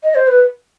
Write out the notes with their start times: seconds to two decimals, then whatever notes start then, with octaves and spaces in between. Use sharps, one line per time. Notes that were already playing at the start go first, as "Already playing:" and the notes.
0.03 D#5
0.15 C5
0.28 B4